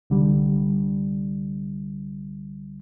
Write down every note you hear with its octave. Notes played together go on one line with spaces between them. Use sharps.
C2 D3 G3